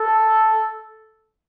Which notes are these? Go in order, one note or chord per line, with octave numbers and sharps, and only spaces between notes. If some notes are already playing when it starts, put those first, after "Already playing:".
Already playing: A4